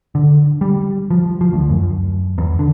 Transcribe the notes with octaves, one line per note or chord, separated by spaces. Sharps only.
D3
G3
F3
F3
D2
F#2
E2
D3